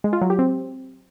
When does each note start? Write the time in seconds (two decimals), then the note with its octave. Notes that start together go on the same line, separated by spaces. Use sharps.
0.04 G#3
0.13 F4
0.21 F#3
0.30 G4
0.39 C4